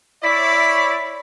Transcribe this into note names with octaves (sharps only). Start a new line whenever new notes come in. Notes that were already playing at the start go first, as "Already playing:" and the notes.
E4 C#5 D5 B6